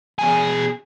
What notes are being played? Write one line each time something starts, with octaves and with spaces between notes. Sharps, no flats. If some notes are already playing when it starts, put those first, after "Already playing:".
B2 G#4